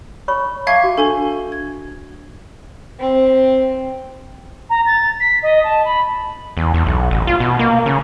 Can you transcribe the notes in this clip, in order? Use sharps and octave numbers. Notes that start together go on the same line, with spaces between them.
C#5 B5 C#6
E5 F5 A5 C#6 D6 G#6
F#4
D4 A4 G#5 C#6 G7
G#6
C4
A#5
A6
B6
D#5
A5
B5
E2
E2
B1
A1
F4
B2
A#3
C#3